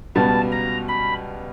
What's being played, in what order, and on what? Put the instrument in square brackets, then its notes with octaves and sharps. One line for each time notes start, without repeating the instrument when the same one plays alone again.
[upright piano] C#2 B2 G3 B3 [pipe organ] A5
[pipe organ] A#5
B5